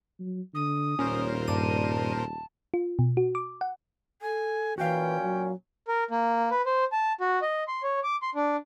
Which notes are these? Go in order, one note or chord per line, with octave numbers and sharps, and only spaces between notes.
F#3
D3 D#6
D#1 A#2 C#4 A#4 C5
G2 D5 A5 D#7
F4
B2
F#4
D6
F#5
A4 G#5
A#2 E3 A#3 C#4 F#4 F5 G5
F#3
A#4
A#3
B4
C5
A5
F#4
D#5
C6
C#5
D6
C6
D4